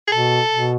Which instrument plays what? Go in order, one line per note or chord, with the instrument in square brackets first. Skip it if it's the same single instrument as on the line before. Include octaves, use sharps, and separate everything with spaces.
[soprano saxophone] G#4
[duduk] B2 [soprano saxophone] A4
[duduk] B2